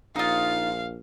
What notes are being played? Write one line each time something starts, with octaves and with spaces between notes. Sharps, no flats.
A#1 D#4 F4 F5